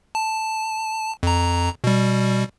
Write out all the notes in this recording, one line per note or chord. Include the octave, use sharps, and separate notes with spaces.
A5
F2 A#5
B2 G3